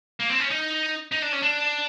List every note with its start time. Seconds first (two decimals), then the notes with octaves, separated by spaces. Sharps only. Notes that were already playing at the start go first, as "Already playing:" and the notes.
0.20 A#3
0.30 C4
0.40 C#4
0.50 D#4
1.12 D#4
1.22 D4
1.32 C#4
1.42 D4